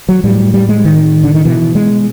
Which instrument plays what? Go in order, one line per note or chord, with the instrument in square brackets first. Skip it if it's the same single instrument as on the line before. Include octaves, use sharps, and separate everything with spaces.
[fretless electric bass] F#3
A2 G3
G3
G#3
D#3
D3
D#3
B2 E3
G#3